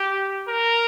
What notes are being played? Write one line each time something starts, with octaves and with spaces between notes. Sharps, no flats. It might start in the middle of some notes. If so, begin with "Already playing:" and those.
Already playing: G4
A#4